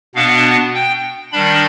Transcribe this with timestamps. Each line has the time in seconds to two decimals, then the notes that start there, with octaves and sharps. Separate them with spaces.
0.15 B2 B3 D4 F5
0.75 G5
1.32 D#3 G3 D4 B5